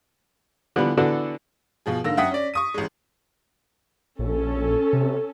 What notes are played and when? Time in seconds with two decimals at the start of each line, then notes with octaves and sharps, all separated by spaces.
0.76 D3 E3 F3 G3 B3
0.97 D3 E3 B3 D4 F#4 A4
1.86 B2 F3 G#4
2.04 G#2 D3 A#3 E6 A#6
2.17 F#2 E5 F#5 G5 D#6 B6
2.31 C#4 D5
2.54 C#6 D#6 D#7
2.74 A1 G#3
4.19 A#1 C#4 A4
4.93 C3